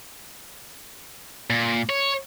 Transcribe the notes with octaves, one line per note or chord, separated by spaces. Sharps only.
A#2
C#5